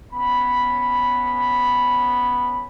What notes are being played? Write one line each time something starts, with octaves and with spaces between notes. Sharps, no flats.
B3 C#4 B5